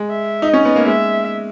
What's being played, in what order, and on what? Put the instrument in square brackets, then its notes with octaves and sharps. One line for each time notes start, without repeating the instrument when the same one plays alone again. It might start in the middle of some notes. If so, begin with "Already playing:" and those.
Already playing: [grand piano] G#3
[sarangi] E5
[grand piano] D#4
[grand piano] C#4 [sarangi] D#5
[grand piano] B3
A#3
[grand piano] G#3 [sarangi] E5